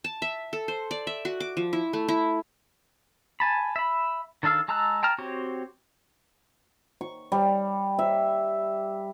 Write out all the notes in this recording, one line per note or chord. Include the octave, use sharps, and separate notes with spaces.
A5
E5
A4
C5
D5
E5
F#4
D6
F3
E4
A3
E4
G#5 A5 B5
E5 B5
D#3 D4 A4 F5 E6
G#3 A5 A#5 E6 F#6
G5 A5 A#5 F6
C4 F#4 G4 C5 C#5
C#6
G3
E5